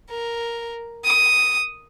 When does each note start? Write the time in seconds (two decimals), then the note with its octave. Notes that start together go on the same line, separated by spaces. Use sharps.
0.10 A#4
1.05 D#6